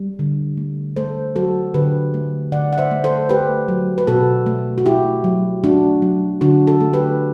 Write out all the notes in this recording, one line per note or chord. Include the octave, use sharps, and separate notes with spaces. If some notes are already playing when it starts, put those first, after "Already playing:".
Already playing: G3
D3
A3
A3 A4 C5
F#3 F#4 A4
D3 G4 B4
A3
D3 D5 F#5
F#5
C5 E5
A3
A4 C5
A3 G4 B4
F#3
B4
B2 F#4 A4
A3
F#4
A3 E4 G4
F#3
A3 D4 F#4
F#3
D3 D4 F#4
F#4 A4
A3
G4 B4